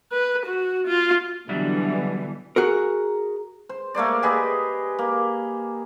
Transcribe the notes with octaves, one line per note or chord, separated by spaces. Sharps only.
B4
F#4
F4
B2 D3 E3 F#3 G3 E4
F#4 G#4 A#4
C5
A3 A#3 C5 D5
G4 G#4 B4 D#5
A#3